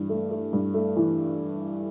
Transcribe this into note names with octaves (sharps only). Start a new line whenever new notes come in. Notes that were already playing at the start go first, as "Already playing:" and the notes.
Already playing: G2 E3
A3
A3
G2
A3
E3